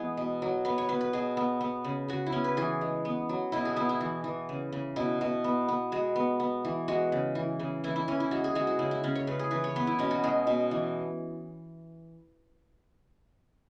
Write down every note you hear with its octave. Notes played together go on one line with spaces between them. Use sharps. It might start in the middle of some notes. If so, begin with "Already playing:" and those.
Already playing: E3 G#3 B3 G#4
B2
F#3
B3 B4
C#5
B3 B4
B4
B2 G#4
B3
B3
C#3
C#3 F#4
E4
B3 C#4
B4
E3 G#4
G#3
B3
F#3
B2 E4
G#4
B3 E4
E4
E3
E3
C#3
C#3
B2 E4
B2
B3
B3
G#3 F#4
B3
B3
E3
G#3 F#4
C#3
E3
C#3
E3 E4
E4
E3 C#4
E4
G#3 F#4
G#4
G#3 F#4
F#4
C#3 E4
E4
C#3 C#4
C#5
C#3 B4
G#4
E3 B4
C#5
B3 B4
E4
B2 C#4
F#4
G#3 G#4
B2
E3